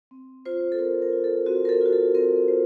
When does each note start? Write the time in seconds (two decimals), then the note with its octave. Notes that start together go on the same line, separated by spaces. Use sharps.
0.11 C4
0.46 F4 C5
0.72 A4
0.79 C4 A#4
1.02 A#4
1.13 F4
1.24 A4
1.46 C4 F#4
1.65 A#4
1.69 A4
1.81 F4 F#4
1.93 A4
2.14 C4 A#4
2.48 F4 C5